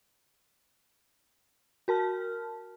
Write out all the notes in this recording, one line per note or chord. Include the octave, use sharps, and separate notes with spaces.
F#4 A#4 A5 F6